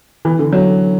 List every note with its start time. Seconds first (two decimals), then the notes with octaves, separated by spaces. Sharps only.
0.25 E3
0.39 D3
0.53 F#3